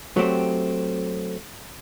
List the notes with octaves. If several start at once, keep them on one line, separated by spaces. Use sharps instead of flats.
F#3 A3 C4 G4